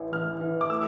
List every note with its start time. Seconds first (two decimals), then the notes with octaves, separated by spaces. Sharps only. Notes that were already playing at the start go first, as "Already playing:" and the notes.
Already playing: A1 E3
0.12 A1 F6
0.41 E3
0.61 D6
0.69 A3 E6